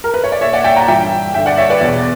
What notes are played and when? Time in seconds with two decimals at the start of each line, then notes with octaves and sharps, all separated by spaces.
0.04 A#4
0.14 B4
0.24 C#5
0.32 D5
0.41 A#2 C#5 E5
0.53 D5 F#5
0.64 E5 G5
0.76 F#5 A#5
0.88 G2 E3 E5 G5
1.34 G2 E5 G5
1.39 D3
1.46 D5 F#5
1.58 C#5 E5
1.70 B4 D5
1.81 E2 B2